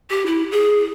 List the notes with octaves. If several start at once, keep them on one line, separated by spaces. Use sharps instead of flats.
G4
E4
G#4